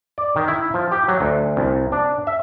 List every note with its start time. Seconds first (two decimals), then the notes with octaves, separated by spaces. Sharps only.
0.18 D5
0.36 D#3
0.48 E4
0.74 F3
0.92 G4
1.08 F#3
1.21 D2
1.57 C2
1.92 D4
2.27 E5